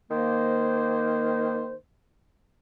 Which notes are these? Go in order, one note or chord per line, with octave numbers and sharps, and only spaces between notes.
D#3 A#3 C5